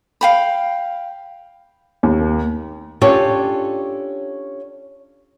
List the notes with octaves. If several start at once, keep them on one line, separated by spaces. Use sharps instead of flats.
F5 G5 B5
D#2
A#3
C#4 D4 F4 G4 A4 C#5